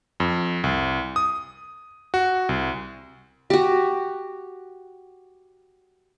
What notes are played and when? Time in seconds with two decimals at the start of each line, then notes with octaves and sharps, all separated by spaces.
0.20 F2
0.64 C2
1.16 D#6
2.14 F#4
2.49 C2
3.50 F#4 G4